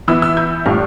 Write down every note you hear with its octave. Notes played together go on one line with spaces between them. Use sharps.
E3 B3 E4 E6
E6
G6
A2 G3 D4 F4 F6